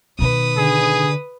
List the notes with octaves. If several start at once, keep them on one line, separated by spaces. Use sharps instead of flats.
B2 D#3 B4 D#6
D3 G#4